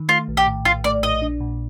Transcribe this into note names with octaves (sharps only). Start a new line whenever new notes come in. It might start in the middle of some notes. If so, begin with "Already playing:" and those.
Already playing: D#3
A3 F4
A#1
G4
A2
A#1 F4
A3 D5
A#1 D#5
D4
A#2